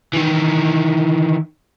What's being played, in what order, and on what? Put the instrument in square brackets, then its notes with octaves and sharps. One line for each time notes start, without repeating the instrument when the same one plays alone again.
[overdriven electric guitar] D#3 E3